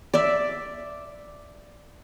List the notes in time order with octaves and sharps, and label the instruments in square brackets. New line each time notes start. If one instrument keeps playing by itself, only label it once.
[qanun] D5 E5